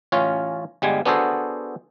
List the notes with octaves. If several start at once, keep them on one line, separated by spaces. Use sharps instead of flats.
A1 C#4 F4 C#5
G1 G3 G#3 G#5
B3 D4 F#4 G#4 A4 C5